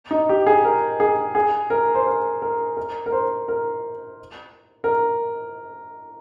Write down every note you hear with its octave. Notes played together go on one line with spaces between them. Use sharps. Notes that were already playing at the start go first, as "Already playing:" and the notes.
D#4
G4
G#4
A#4
G#4
G#4
A#4
C5
A#4
A#4
A#4
A#4
C5
A#4
A#4